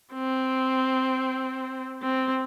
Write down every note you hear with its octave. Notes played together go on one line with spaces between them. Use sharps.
C4
C4